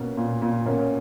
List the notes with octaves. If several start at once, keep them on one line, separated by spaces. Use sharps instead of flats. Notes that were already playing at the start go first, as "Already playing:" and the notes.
Already playing: B2 A#3 C#4
A#2
A#2
B2 A#3 C#4